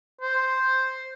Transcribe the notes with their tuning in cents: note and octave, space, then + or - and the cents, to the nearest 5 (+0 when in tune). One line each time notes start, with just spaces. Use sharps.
C5 +0